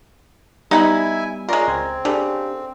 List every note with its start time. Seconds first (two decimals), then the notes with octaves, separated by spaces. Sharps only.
0.71 G3 B3 D#4 E4 E5 F#5 G#5 B5
1.49 G#3 C#4 F4 A#4 D5 C6
1.68 C#2 C4 G#6
2.05 C#3 D4 G4 A4